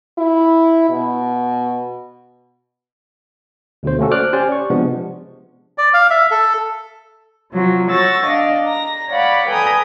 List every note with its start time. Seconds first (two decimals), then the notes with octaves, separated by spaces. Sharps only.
0.18 E4
0.89 B2
3.83 D2 B2 D3 C5
3.99 A3 A#3 C#4 F#4 A4
4.11 C5 D5 D6 F6 F#6
4.33 C#4 G4 C5 D5 G#5
4.52 C#6
4.70 C3 F3 G#3 B3 D4
5.78 D5
5.94 F5
6.10 E5
6.31 A4
7.52 C3 F3 F#3 F#4
7.91 C#5 F#5 C#6 E6 A6 A#6
8.27 D4 D5 D#5 F5
8.67 A#5 A#6
9.11 C#5 D5 F5 F#5 B5 D6
9.48 A4 B4 G5 G#5 A#5 D#6